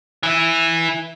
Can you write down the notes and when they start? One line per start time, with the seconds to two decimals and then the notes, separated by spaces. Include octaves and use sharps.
0.23 E3 E4